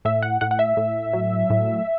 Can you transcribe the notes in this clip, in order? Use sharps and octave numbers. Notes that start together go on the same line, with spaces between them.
A2 E5
F#5
A2 F#5
F#5
E5
A2
F#3
A2